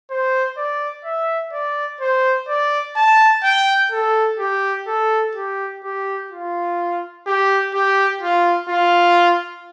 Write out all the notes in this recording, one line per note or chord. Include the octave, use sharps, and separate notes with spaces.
C5
D5
E5
D5
C5
D5
A5
G5
A4
G4
A4
G4
G4
F4
G4
G4
F4
F4